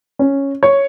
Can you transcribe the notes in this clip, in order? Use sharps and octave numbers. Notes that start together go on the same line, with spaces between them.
C#4
C#5